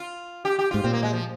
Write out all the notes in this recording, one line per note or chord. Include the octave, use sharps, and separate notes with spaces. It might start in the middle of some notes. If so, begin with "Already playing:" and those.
Already playing: F4
G4
G4
G#2 F4
A#2 C4
A#3
G#3
F3